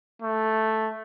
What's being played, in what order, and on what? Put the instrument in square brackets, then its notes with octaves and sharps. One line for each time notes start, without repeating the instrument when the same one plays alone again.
[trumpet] A3